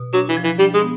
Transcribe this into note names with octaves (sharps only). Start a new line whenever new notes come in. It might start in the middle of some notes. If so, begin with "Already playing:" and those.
Already playing: B2
F#3 D4
E3
F3
E3
G3 D4
G#3
B3